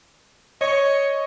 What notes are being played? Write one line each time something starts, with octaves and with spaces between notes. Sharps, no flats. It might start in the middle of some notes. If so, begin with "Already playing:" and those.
C#5 D#5 C#6